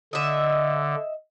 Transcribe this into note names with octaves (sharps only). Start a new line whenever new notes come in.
D3 D#5 E5